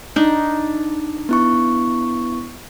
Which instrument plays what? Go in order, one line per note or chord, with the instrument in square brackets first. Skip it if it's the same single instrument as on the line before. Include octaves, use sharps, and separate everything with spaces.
[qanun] D4 D#4
[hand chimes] B3 E4 C#6